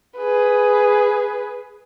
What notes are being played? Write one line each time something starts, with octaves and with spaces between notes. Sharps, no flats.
G#4 B4